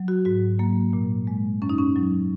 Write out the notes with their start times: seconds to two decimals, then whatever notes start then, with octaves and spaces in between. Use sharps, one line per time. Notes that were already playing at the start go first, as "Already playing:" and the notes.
Already playing: F#3
0.08 F#4
0.25 G#2 F#4
0.59 F#3 A#3
0.93 A#2
1.27 G#3
1.62 F#2 C#4
1.69 D#4
1.78 C#4
1.96 F#3